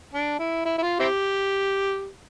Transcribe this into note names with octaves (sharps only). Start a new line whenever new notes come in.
D4
E4
E4
E4
F4
C4 E4 G4